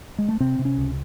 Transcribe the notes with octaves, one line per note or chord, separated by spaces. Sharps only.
G#3
A3
C3 C4
C3
C#4
C#2